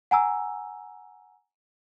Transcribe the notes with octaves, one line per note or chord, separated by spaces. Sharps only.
F#5 G#5 A#5 E6